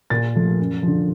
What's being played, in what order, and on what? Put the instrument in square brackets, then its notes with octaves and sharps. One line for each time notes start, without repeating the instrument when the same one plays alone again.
[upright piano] A#2 A6
F3 A3
F#2
D3 F3